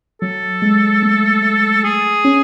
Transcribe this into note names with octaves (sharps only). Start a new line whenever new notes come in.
F#3 A4
G#3
A3
A3
G#4
C#4